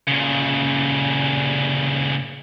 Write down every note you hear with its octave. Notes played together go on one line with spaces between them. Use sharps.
A#2 C#3